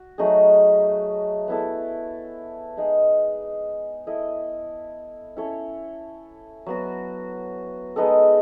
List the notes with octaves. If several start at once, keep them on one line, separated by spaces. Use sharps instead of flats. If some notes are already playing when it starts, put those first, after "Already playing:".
Already playing: F#4
F#3 A3 D#4 G#4
B3 E4 A4
G#3 D#4 G#4
E4 A4 D#5
C#4 E4 A4 C#5
F#3 B3 F#4
G#3 B3 D#4 A4